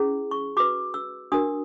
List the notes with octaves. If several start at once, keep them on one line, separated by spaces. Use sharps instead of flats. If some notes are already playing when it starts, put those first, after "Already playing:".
Already playing: C#4 E4 G#4
C#6
F#4 B4 D6
E6
D4 F#4 A#4 D#6